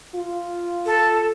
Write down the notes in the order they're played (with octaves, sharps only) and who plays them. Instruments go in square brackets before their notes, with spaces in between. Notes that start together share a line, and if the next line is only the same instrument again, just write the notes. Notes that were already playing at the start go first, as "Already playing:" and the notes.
[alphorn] F4
[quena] A4